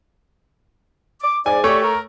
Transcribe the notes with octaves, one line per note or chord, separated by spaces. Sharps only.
D6
G#2 D5 G#5
G3 A3 G4 C#5 D5
A#4